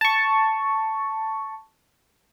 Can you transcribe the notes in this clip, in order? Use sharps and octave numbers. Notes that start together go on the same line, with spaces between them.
A5 C#6